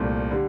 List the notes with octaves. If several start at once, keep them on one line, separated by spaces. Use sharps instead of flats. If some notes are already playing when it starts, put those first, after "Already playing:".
Already playing: C2 A#2 A3 C4
D3 G3